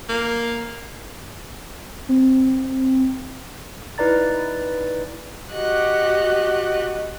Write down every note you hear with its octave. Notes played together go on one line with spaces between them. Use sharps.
A#3
C4
D#4 E4 B4 D5 A#5 A6
F#4 G4 D#5 F#6